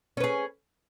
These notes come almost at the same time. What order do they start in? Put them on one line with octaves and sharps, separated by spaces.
C#4 B4 G#4